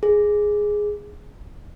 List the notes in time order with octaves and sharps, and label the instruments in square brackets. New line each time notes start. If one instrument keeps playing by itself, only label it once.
[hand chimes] G#4